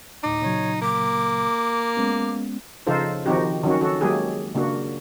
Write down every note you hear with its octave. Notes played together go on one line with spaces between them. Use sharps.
D2 A2 D#4 D6
A#2 C#3 F#3 C#5
A#3 D6
G#3 B3 C#4
C#3 F3 D#4 F4 A4 C5
D#3 F3 C4 D#4 F#4 G4
D#3 F#3 C#4 F#4
F#4 A4
F#3 G#3 A#3 G4 G#4
C#3 A#3 D4 F#4